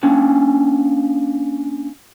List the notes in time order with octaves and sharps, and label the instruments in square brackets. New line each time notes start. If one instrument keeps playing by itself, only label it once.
[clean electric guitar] A#3 C#4 D4